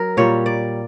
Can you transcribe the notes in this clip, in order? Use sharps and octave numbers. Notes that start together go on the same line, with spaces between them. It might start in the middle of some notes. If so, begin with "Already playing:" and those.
Already playing: F#3 A#4
A#2 G3 C#5
D5